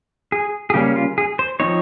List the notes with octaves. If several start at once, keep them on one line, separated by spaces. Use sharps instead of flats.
G#4
G#4
C#3 G3 A#3 C#4 G4
F4
G#4
C5
F3 C4 D#4 C#5